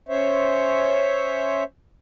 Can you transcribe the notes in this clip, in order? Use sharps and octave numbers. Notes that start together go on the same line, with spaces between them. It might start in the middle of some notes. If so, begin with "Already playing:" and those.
C#4 C5 C#5 E5